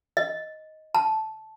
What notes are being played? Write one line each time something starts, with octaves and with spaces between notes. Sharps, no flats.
D#5
A5